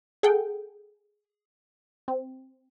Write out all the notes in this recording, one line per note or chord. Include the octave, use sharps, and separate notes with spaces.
G#4 A4 F#5 G5
C4